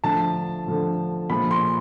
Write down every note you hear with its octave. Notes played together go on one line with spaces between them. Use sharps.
D3 F3 A3 A5
D3 F3 A3
A#2 F3 G#3 B5
C6